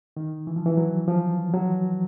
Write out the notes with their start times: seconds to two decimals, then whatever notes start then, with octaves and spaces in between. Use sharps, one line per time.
0.17 D#3
0.47 E3
0.56 F3
0.66 E3
0.77 F#3
1.08 F3
1.54 F#3